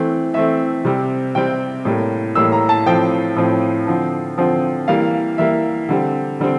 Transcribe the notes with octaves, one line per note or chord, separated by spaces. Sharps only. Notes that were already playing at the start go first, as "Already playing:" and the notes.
Already playing: E3 A3 C4
E3 A3 C4 E5
C3 G3 C4
C3 G3 C4 G5
A2 G3 A#3
A2 G3 A#3 E6
A#5
A5
A2 F3 C4 G5
A2 F3 C4
D3 F3 C4
D3 F3 C4
E3 G3 A#3 F5
E3 G3 A#3 E5
D3 G3 C4
D3 G3 C4